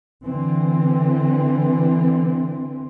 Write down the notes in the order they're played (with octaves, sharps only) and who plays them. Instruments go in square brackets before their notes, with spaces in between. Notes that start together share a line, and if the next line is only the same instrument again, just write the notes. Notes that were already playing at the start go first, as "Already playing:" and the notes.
[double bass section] D3 E3 C4